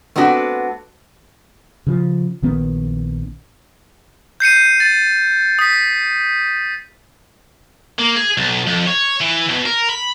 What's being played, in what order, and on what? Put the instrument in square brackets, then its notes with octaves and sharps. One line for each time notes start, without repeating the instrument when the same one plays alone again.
[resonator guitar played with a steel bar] A3 B3 C4 D4 F#4
[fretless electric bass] C#3 F3
A#1 D#3 B3 C#4
[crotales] G6 C7 C#7 D#7
A6
D#6 B6
[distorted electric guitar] A#3
G#4
B1
F2
C#5
E3
B2
A#4
B5